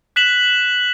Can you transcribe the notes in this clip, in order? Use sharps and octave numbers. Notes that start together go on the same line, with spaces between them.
F#6 B6 E7 F#7